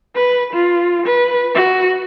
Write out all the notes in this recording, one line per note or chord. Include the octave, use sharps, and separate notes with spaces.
B4
F4
B4
F#4